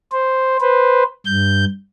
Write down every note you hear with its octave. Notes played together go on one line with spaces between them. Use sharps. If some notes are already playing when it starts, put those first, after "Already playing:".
C5
B4 C5
G2 G6